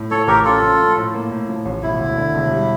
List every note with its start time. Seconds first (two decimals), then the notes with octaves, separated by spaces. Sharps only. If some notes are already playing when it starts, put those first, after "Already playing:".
Already playing: A2
0.10 F3 A4 C#5
0.27 A1 G4 A#4
0.45 C#4 F4 A4
0.62 F3
0.79 A3
0.97 A2
1.14 A#3
1.31 A2
1.49 F3
1.65 A1
1.82 E1 E4
2.00 D2
2.16 D3
2.34 E1
2.51 G3